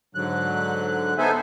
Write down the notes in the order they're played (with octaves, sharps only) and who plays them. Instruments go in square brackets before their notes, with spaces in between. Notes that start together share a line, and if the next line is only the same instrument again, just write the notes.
[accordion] G#2 D3 F#3 F#6
B3 D#4 A4 C5 E5 G#5